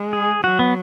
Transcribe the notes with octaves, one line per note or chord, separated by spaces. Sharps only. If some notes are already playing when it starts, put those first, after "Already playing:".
Already playing: G#3
G#4
F#3 F#4
B3